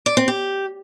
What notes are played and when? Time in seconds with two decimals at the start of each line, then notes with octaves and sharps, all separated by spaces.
0.06 D5
0.17 C4
0.28 G4